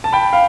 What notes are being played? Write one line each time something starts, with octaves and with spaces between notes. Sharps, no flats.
A5
G5 B5
F5